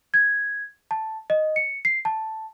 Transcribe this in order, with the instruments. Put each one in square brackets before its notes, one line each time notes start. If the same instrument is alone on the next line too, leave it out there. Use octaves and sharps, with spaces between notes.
[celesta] G#6
A5
D#5
C#7
C7
A5